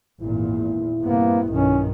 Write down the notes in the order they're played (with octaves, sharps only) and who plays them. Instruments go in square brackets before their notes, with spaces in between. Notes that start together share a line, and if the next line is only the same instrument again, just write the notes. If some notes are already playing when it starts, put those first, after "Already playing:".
[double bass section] G#1 E2 A#2 [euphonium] E4
[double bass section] G2 C3 B3 [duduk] A#3
[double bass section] B1 G2 D#3 [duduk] C#4